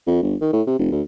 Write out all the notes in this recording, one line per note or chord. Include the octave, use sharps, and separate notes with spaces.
F2
G1
D#3
A2
C3
F1
D2